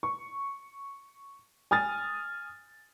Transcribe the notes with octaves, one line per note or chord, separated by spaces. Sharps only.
C#6
G#5 D#6 F6 A6